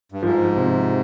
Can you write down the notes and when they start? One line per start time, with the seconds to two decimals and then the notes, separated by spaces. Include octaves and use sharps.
0.12 G2
0.22 G#2 F3
0.56 C3